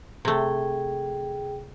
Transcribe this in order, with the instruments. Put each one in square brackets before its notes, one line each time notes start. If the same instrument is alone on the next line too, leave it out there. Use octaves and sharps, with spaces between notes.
[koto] C3 A3 [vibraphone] G#4 G5